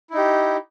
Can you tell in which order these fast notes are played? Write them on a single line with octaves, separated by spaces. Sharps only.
E4 D#4 G4